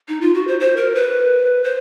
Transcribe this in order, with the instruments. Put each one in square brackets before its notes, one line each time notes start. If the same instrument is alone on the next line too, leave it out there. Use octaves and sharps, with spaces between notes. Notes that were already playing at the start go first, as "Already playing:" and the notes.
[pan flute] D#4
F4
F#4
C5
C5
A#4
B4
C5